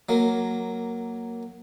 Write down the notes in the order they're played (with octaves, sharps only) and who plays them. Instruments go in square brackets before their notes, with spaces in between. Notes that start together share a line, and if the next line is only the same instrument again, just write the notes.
[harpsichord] F#3 A#3